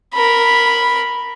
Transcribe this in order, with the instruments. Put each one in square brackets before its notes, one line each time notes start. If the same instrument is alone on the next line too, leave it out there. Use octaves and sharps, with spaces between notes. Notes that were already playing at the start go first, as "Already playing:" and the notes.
[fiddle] A#4 B5